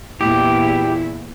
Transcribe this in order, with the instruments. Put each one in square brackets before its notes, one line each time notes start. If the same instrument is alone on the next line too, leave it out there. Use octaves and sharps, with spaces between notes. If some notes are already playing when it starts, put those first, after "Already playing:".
[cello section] E2 A#2 E4 [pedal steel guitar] G4